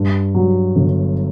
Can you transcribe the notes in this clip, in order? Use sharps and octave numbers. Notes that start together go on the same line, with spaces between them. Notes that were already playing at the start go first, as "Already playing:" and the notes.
Already playing: G2
F#3
G1